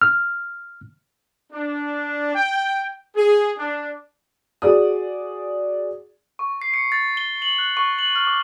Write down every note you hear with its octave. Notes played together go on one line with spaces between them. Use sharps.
F6
D4
G5
G#4
D4
F#4 G#4 D5 D#6
C#6
C7
C#7
A6
G7
F#7
F#6
C#6
F#7
F6
D6